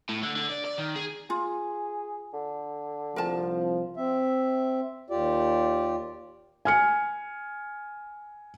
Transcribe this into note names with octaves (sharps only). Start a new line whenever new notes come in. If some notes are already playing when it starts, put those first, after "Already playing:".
A2
D3
D3
D5
D5
D#3
G#4
F4 G#4
D3
C2 F3 A#4 A5
C4 E5
D#2 F4 G4 D5
G#5 F6 C#7